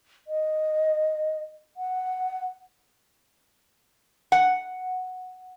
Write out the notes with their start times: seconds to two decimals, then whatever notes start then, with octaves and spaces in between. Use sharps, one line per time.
0.27 D#5
1.77 F#5
4.32 F#5